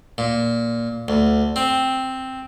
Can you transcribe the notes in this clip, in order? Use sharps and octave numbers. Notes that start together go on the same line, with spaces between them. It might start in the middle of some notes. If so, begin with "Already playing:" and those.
A#2
D2
C4